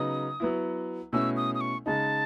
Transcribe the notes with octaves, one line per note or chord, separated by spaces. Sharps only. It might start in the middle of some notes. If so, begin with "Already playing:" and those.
Already playing: C#3 F#3 B3 D#4 D#6
F#3 B3 E4
B2 A3 C#4 E4 E6
D#6
D#6
C#6
C#3 G#3 D#4 A5